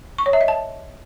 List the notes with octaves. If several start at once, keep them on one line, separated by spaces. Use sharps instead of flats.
C#6
C#5
E5
D#5
A5